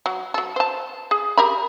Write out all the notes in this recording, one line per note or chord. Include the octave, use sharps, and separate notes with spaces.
F#3
F#3 A4
C5 A5
G#4
G4 A#4 B5